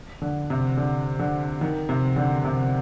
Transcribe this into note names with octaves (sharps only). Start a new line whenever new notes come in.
D3
C3
D3
D3
D#3
C3
D3
C3